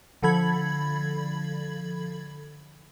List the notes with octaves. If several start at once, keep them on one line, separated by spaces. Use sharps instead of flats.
D3 F3 A4 B5 G#6 F#7